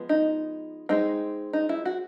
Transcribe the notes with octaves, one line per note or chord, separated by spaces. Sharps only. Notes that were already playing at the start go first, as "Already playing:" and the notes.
Already playing: F3 G#3 B3
D#4
G#3 C4 D#4
D#4
E4
F#4